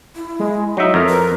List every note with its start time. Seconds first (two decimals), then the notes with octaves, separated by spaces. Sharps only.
0.16 E4
0.39 G#3
0.77 F#3 D#4 E5
0.94 F2 A#4
1.09 B4